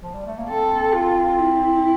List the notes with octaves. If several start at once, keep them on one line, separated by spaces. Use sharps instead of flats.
F3
G3
A3
A#3
C4 A4
F4
E4